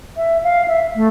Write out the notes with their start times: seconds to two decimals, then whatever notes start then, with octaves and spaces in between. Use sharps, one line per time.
0.17 E5
0.44 F5
0.68 E5
0.96 A3